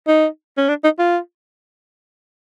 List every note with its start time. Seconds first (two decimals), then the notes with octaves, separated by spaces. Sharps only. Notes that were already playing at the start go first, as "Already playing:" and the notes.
0.07 D#4
0.57 C#4
0.69 D4
0.84 D#4
0.99 F4